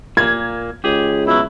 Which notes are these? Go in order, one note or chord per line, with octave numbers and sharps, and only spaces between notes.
A#2 A#3 G#6
C#2 G4 G#4
B2 F#3 E4